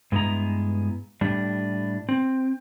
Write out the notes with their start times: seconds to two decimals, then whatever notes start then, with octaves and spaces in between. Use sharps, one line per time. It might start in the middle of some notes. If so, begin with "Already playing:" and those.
0.12 G2 G#3 B3 E4 A#5
1.21 A2 G3 D4
2.09 C4